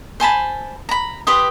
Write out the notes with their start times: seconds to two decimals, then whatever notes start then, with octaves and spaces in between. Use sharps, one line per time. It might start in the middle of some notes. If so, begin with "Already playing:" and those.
0.20 C5 G#5 A5 B5
0.89 A#5 B5
1.27 G4 B4 C6 D#6